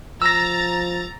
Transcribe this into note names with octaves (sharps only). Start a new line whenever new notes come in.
F3 A#5 E6 A6 A#6